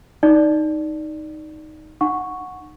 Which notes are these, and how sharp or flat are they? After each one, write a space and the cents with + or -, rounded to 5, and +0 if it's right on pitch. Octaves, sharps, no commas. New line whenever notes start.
D#4 +0 D5 +0
D#4 -35 F#5 -10 C#6 +0